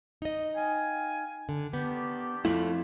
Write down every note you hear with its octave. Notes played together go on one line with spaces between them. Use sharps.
D#4 D#5
F5 G5 G#5
D3
D#3 B3 D4 G4
F2 A3 E4 F4